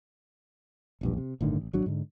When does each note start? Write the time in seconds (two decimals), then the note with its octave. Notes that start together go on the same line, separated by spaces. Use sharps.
1.01 E1 A#1 G2
1.17 C3
1.41 G1 A2 D3 D#3
1.56 A1
1.73 G#1 F#3 D4
1.86 G#2 D3